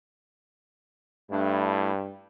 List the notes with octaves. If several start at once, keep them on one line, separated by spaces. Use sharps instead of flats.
G2 A3 D4 E4